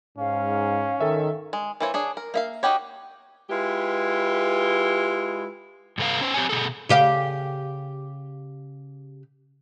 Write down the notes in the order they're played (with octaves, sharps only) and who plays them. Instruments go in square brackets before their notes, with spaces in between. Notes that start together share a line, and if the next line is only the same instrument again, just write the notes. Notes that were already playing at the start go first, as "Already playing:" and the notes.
[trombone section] G#2 [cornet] C#4 [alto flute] F5
[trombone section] D#3 [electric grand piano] A4 E5
[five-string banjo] G#3
E3 A#3 E4 C5 C#5
D4 G#4 C#5
A#4
A#3 E5 F5
D#4 E4 F#4 G4 C#5
[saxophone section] G#3 E4 F4 G4 B4
[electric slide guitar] G2 C3 A4 B4 F5
C#4 C5
C4 G4 C#5 G#5
B2 F3 G#4 A4
[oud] C#3 G4 F5